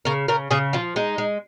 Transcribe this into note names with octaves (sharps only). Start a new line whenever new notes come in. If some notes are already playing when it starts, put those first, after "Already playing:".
C#3 A#4
C#3 A#4
C#3 G#4
F3 F4
G#3 D#4
G#3